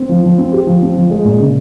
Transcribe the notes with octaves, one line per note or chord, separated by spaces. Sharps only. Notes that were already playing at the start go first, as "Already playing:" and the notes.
Already playing: C4
F3
F3
C4
G4
F3
C4
F3
G#3
A#2
C#3